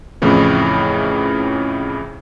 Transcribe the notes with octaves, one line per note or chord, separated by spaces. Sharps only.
F2 A2 C#3 E3